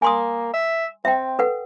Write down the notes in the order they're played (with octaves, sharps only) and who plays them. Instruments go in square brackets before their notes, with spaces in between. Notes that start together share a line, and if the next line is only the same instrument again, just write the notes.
[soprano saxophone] A#3 [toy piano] G#5 C6 D#6
[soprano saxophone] E5
[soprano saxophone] C4 [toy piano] E5 G5
[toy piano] A4 B4 F#5